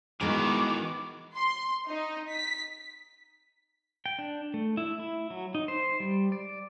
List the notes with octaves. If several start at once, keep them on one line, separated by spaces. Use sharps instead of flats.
D#3 E3 G#3 B3 F#4 A#4 D6
C6
D#4
B6
G5
D4
A3
E4
E4
F#3
D#4
C5
G3
D5